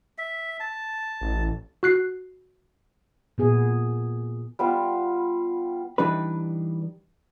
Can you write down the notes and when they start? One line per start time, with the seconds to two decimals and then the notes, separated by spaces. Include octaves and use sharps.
0.18 E5
0.60 A5
1.21 A1
1.83 F#4 F#6 C7
3.38 A#2 B3 G#4
4.59 G3 B3 F4
5.98 E3 G3 D4 D#4 B4